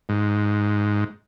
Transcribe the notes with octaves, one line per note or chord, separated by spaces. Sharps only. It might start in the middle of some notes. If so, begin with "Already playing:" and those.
G#2